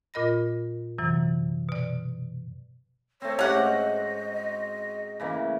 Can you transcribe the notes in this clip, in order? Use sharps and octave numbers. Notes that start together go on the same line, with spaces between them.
A#2 F4 A#4 D#5 B5 A#6
F#2 C3 E3 F#3
B2 D5
A3 C4 C#5
G#2 C#4 F#4 G4 F#5
D#5
C#3 E3 A#3